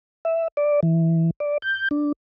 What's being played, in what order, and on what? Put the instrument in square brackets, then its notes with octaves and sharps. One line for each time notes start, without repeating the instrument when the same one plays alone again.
[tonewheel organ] E5
D5
E3
D5
G6
D4